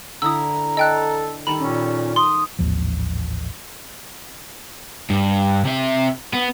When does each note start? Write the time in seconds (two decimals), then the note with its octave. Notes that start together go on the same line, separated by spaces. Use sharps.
0.22 D3 E4 A#5 D#6 E6
0.77 A4 D#5 G5 F#6
1.47 D#3 G3 A4 B5
1.59 A#2 C#4
2.16 C6 D#6
2.59 A1 D#2 G#2 F3
5.10 G2
5.65 C3 E5
6.33 B3